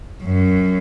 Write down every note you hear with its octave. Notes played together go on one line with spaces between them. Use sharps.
F#2